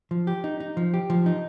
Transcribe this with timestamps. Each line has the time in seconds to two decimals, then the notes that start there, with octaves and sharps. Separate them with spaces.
0.11 F3
0.27 G4
0.44 D#4
0.60 D#4
0.77 F3
0.94 G4
1.10 F3
1.26 D#4